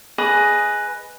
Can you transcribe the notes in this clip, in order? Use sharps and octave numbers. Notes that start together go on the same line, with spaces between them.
G#4 B4 D#5 D#6